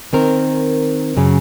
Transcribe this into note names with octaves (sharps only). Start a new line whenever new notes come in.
D#3 C4 A#4
F#2 C#3